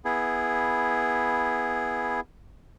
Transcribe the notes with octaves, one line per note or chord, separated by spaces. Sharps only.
B3 E4 G#4